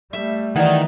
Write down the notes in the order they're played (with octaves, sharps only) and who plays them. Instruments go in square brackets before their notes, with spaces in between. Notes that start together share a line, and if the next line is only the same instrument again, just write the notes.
[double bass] G3 A3 [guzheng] E5
[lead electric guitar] D#3 [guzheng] E3 D#4 [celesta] D5 F#5